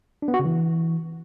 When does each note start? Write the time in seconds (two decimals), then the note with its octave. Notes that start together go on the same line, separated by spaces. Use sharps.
0.22 D4
0.28 B3
0.34 F#4
0.39 C#3
0.45 E3